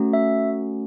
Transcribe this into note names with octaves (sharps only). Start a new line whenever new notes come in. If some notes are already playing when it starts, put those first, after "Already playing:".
Already playing: A3 C#4 F#4
E5